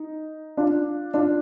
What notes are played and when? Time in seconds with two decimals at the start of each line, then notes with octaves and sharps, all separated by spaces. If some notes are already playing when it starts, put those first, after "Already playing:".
Already playing: D#4
0.57 D4 F4
1.14 D4 F4